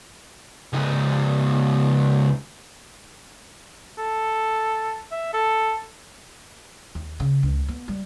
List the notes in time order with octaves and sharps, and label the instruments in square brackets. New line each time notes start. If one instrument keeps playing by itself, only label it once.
[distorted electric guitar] C#2 D#4
[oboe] A4
E5
A4
[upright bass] D#2
C#3
C#2
B3
G3